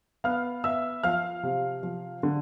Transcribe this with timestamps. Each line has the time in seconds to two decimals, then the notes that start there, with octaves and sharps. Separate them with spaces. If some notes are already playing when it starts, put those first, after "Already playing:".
0.24 B3 F5 F6
0.64 B3 E5 E6
1.03 F3 F5 F6
1.43 C3
1.83 F3
2.23 D3